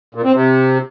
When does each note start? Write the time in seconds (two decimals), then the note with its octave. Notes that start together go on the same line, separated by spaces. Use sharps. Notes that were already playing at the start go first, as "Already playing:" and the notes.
0.15 A#2
0.24 C4
0.34 C3